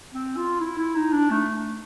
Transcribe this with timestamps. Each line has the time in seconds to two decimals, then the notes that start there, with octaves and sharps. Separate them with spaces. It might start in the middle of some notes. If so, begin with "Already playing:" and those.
0.14 C4
0.37 F4
0.60 E4
0.78 E4
0.95 D#4
1.13 D4
1.31 A3